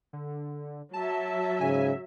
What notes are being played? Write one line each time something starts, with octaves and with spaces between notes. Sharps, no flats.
D3
F#3 E5 A5
G#2 C#3 G#5